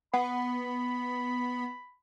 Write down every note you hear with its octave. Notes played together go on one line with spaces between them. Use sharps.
B3 F#5 B5